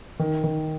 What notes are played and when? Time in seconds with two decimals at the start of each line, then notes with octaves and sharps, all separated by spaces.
0.19 D#3
0.44 D#3